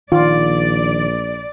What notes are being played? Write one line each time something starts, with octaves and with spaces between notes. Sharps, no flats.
A#1 D#3 F4 D5